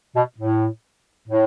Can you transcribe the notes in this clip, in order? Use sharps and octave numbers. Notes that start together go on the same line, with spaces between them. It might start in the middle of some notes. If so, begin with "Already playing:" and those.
B2
A2
A2